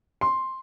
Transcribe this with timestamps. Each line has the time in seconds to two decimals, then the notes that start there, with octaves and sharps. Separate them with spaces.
0.21 C6